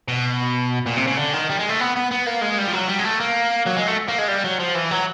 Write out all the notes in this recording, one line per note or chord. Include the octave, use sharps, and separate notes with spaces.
B2
A#2
C3
C#3
D3
D#3
G3
G#3
A3
B3
B3
B3
A#3
G#3
G3
F3
F#3
G3
G#3
A3
A#3
F#3
G#3
A3
A#3
G#3
G3
F#3
F3
E3
F#3